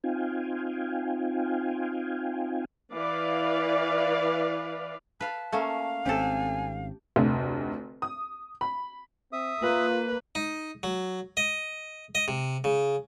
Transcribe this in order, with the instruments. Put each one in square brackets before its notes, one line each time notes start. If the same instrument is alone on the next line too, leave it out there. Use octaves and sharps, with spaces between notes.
[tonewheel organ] C4 D#4 F4 F5 G5 G#5
[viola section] E3 B4 D5 F5
[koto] B4 F5 [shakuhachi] A5
[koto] A3 A#3 C#4 [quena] F5
[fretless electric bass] G#1 C4 C#4 [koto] G4 A4 [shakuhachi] G#5
[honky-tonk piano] F1 D2
D#6
B5
[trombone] C4 [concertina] E5 D#6
[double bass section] A#3 [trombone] F4 [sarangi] B4
[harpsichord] D#4
F#3
D#5
D#5
C3
C#3